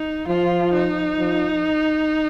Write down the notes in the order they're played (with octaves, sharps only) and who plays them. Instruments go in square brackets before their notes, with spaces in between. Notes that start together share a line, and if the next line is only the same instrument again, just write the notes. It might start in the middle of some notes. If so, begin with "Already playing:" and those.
Already playing: [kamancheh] D#4
[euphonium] F3 [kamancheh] F4
[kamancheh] D#4
[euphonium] F3